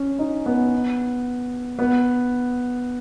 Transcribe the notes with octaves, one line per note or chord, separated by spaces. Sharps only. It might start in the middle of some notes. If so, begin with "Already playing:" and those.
Already playing: C#4
D#4
B3
B3